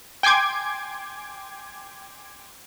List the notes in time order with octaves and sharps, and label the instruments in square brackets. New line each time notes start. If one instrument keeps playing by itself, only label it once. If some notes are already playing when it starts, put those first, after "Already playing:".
[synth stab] G5 G#5 C6 D6 G#6